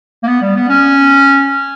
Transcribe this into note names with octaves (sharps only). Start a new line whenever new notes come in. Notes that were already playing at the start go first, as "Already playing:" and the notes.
A#3
B3
G3
B3
C#4